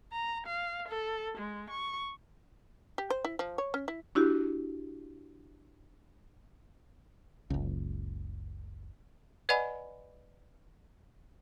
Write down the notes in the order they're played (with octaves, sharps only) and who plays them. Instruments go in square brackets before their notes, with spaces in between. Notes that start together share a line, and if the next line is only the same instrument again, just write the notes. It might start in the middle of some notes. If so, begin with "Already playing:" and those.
[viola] A#5
F5
A4
G#3
C#6
[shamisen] G4
C5
E4
F3
C#5
C#4
E4
[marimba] D4 E4 F#4 G4
[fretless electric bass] F#1 C#2
[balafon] B4 D5 D#5 F#5 G#5 B5